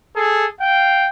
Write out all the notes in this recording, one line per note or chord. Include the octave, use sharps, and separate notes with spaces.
G#4 A4
F5 G5